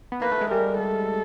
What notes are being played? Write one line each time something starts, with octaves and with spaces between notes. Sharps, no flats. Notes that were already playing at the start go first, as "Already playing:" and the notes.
B3
A#3 B4
A3
G#3
G3 A#4
A4